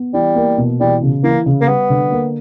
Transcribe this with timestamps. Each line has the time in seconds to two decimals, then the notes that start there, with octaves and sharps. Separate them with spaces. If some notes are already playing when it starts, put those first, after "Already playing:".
Already playing: B3
0.14 E3 G3
0.36 A#3
0.58 B2
0.80 E3 G3
1.02 C#3
1.24 E3 A#3
1.46 C#3
1.61 A#3
1.68 G3 B3
1.90 D3
2.12 A#3